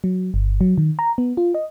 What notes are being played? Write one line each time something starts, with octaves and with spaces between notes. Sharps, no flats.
F#3
G1
F#3
D#3
A#5
B3
F4
D#5